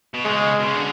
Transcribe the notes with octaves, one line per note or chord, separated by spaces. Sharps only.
B2
C#3 G#3
B2
C#3
D3